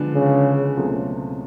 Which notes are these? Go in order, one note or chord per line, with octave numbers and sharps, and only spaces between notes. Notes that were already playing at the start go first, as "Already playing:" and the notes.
Already playing: D3 F3 G#3 B3 D4
C#3
C#2 B2 F#3 A3 C4